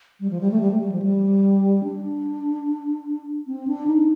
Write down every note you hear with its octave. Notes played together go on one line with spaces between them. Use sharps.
G3
F3
G3
A3
G3
A3
G3
F3
G3
D4
C4
D4
D#4